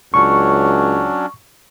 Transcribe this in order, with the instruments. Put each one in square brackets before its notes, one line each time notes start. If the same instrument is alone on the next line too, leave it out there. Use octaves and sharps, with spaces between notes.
[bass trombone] C#2 [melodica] F#3 C#4 D4 [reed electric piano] C#6